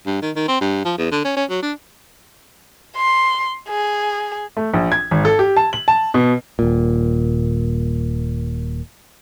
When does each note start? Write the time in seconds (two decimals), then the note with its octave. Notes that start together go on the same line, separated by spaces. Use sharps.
0.06 G2
0.22 D#3
0.36 D#3
0.48 C4
0.61 G2
0.85 F3
0.98 E2
1.12 D3
1.25 C#4
1.36 C#4
1.50 F#3
1.63 D4
2.96 C6
3.68 G#4
4.57 A3
4.74 A#1
4.92 G#6
5.11 G#1
5.25 A4
5.39 G4
5.57 A5
5.73 F#7
5.88 A5
6.14 B2
6.59 D#1 A#2